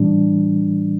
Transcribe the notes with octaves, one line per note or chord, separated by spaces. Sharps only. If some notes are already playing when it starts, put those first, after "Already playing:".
Already playing: A2 E3 G3 D4